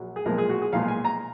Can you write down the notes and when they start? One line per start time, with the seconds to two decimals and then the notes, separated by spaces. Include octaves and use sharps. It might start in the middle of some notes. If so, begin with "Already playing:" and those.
Already playing: A#1 F#3
0.16 G#4
0.25 B1 A#2 F3 G#3 A#4
0.38 G#4
0.49 F#4
0.62 G#4
0.73 B1 A#2 F3 G#3 F5
0.88 G#5
1.05 A#5